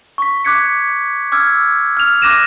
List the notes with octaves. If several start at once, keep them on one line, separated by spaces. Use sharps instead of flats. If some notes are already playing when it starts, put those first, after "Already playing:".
C#6 B6
D6 F#6 G#6 B6 C#7
D6 E6 F6 G#6
F6 F7
D6 F#6 A#6 D#7 E7